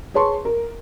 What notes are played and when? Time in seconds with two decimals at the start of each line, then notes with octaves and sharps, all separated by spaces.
0.14 G#4 B4 C#5 A5 C6 C#6
0.45 A#4